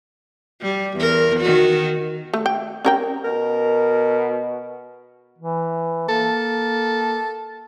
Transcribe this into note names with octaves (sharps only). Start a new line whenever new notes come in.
G3
E2 A#4
D#3 F#4
A3
G5
C#4 A#4 G5
B2 A#4
E3
A#3 A4